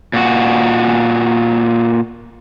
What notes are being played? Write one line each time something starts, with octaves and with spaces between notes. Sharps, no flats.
A#2 F#4